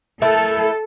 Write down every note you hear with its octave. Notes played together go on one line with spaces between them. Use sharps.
A3 E4 A4 A#4